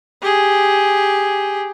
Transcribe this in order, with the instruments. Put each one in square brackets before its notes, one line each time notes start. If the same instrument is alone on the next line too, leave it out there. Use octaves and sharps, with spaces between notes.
[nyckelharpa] G4 G#4